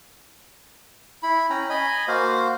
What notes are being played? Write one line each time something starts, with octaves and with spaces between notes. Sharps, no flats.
E4 B5
C#4 G5 A#5
D#5 G#5 B5
A#3 F#4 C5 F5